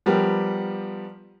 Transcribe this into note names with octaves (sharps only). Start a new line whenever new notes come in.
F3 G3 B3 G4 A#4